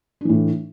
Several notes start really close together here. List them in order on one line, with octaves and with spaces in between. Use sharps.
D4 E3 A2 A3